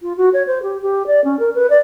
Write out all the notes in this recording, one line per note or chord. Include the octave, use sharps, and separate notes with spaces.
F4
F#4
C#5
C5
G4
G4
D5
C#4
A#4
B4
D5